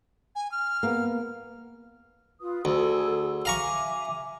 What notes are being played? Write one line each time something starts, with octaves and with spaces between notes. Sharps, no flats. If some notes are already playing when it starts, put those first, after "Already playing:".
G#5
F6
A#3 B3
F4 B4 D#6
D2 G#4 A4 E6
E5 F5 G#5 A#5 C#6 D6